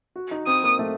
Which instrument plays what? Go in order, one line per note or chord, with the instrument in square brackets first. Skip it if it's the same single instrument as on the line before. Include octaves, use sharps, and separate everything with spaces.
[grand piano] F#4
D#4
[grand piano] C4 [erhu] D#6
[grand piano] A#3
A3